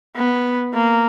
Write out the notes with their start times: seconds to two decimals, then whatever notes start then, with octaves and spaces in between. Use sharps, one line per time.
0.16 B3
0.74 A#3